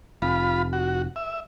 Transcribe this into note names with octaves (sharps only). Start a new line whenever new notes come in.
F1 F4 B5
F#4
E5